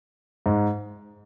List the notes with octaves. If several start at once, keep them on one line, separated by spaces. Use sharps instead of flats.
G#2